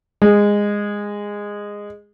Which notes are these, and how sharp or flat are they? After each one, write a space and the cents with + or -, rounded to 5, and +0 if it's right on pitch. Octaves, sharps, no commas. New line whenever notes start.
G#3 -15